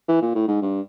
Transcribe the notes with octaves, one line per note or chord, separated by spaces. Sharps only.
E3
A#2
A2
G#2
G2